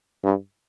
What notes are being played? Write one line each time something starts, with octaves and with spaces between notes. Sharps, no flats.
G2